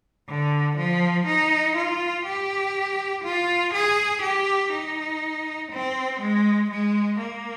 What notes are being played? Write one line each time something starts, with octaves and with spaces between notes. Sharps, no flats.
D3
F3
D#4
F4
G4
F4
G#4
G4
D#4
C4
G#3
G#3
A#3